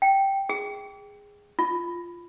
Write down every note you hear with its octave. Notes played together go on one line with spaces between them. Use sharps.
G5
G#4
F4